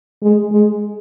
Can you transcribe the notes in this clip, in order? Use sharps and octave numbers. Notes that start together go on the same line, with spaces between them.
G#3
G#3